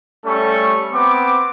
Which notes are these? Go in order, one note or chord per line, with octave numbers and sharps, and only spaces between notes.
G3 A3 C#4 A4 C#6
B3 C4 D6